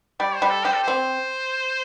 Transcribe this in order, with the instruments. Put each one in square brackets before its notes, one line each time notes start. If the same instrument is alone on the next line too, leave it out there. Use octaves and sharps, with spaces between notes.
[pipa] G3 [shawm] D5
[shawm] C5
[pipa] G3
[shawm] A4
[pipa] G4 [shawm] C5
[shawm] A4
[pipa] C4 [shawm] C5